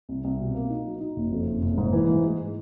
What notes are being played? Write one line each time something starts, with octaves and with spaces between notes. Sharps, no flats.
C2
C2
B2
A#3
D#4
F#3
D#4
F#1
F2
F#1
F#1
G#2
E3
G#2
G#3